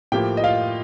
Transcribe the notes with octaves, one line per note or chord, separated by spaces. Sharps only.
A2 F3 A#3 G4 G5
D#5
F4 F5